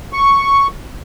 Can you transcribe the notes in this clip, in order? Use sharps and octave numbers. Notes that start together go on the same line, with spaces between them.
C#6